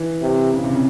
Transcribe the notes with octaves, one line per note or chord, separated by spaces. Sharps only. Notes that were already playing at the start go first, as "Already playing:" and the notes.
Already playing: E3
C3
C#3
C3
C#3